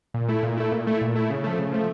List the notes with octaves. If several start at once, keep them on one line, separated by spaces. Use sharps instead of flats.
A#2
A3 E4
A#2
A3 E4
A#2
A3 E4
A#2
A3 E4
C#3
F3 A3
C#3
F3 A3